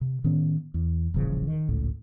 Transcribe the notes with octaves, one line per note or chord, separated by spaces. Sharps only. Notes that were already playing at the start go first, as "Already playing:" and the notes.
C3
A2 D#3 B3 C#4
E2
D#1 A1 C#3 F3
D#3
G#1 C#2 A2